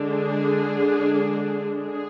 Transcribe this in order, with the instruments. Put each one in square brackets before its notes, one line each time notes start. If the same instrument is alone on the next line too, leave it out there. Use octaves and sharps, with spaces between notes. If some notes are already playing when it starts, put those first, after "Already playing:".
Already playing: [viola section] D3 G#3 D4
G#4
G#4